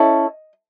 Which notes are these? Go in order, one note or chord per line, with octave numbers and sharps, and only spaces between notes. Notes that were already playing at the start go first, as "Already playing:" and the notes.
Already playing: C#4 E4 A4 D#5